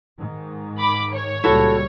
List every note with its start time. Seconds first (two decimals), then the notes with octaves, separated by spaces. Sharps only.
0.16 G#2 D#3
0.78 B5 D6
1.13 C#5
1.44 C#2 A#2 G3 E4 F#4 A4